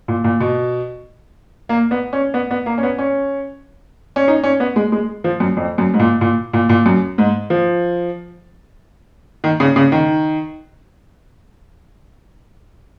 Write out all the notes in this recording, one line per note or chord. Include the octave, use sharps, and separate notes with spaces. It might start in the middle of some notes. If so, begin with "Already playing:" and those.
A#2
A#2
B2
A#3
B3
C#4
B3
B3
A#3
C#4
B3
C#4
C#4
D#4
C#4
B3
G#3
G#3
F3
F#2
F2
F#2
G#2
A#2
A#2
A#2
A#2
F#2
G#2
F3
D#3
C#3
C#3
D#3